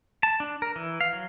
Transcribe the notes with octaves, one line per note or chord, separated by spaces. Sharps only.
A5
D4
A#4
E3
F5
F#3